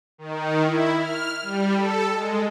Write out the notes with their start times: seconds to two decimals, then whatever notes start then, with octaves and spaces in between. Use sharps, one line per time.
0.18 D#3
0.63 E4
0.97 F6
1.43 G3
1.74 A4
2.14 G#3